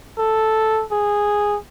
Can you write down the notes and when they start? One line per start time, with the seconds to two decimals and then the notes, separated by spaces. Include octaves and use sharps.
0.18 A4
0.92 G#4